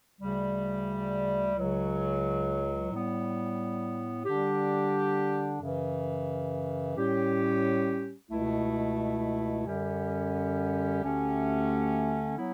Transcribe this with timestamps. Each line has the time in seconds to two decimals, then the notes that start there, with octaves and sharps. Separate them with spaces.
0.20 D2 C#3 G3
1.56 C#2 C#3 F#3
2.92 A2 G3 B3
4.26 D3 G3 D4 G4
5.61 F#2 C#3 E3
6.96 A2 G3 C#4 G4
8.31 C#2 B2 A3 E4
9.66 F#2 D3 G3 C#4 G4
11.02 D2 D3 A3 C#4 G4
12.37 F#3 B3 E4